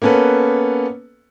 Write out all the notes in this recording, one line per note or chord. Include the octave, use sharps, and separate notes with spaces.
A#3 B3 C#4 A4 B4